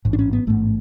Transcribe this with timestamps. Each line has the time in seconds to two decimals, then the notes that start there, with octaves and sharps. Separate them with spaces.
0.05 A1 G#2
0.13 D4
0.19 C#4
0.33 B3
0.47 A1 G#2 A3